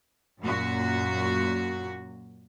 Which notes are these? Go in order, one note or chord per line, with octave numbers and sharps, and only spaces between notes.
F#2 A#2 F#4